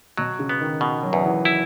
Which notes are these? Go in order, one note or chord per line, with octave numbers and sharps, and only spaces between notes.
B2 F#3
C#3
B3
D#3
B2
F#3
E2
E3
E4